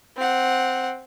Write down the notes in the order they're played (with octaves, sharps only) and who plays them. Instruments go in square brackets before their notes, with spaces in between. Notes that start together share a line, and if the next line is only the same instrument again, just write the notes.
[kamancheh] C4 F#5